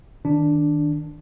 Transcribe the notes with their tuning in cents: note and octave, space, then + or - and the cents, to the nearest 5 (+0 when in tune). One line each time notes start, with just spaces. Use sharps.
D#3 +0 D4 +0